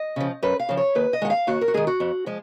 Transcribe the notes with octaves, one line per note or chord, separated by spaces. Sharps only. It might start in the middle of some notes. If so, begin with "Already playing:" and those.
Already playing: D#5
C#3 F3
F#2 B4
F5
C#3 F3
C#5
D#2 B4
D#5
D#3 G#3 F#5
F5
D#2 F#4
A#4
F#4
D#3 G#3 G#4
F#4
F2
F3 G#3